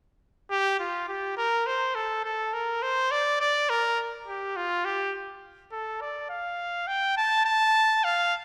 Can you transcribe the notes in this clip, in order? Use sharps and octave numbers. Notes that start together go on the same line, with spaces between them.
G4
F4
G4
A#4
C5
A4
A4
A#4
C5
D5
D5
A#4
G4
F4
G4
A4
D5
F5
G5
A5
A5
F5